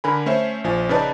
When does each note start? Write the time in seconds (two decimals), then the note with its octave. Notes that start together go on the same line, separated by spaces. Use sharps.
0.04 D3 A#4 G#5 B5
0.26 A3 C#4 C5 E5
0.64 A#1 F3 G#5
0.89 C#3 C#4 D#4 B4 D5 A5